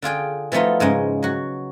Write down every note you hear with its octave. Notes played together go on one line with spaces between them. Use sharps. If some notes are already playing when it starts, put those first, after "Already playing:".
D3 F4 G#4 G5
E3 F3 A3 B3 D#4 F4
G#2 C#3 G#3
F#3 F#4